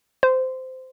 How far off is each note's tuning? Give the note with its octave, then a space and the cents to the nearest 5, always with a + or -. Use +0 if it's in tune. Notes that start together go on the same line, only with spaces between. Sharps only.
C5 -15